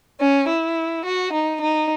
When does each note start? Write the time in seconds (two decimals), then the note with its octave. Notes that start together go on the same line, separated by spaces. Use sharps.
0.19 C#4
0.47 E4
1.04 F#4
1.32 D#4
1.60 D#4